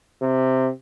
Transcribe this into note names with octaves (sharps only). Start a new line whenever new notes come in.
C3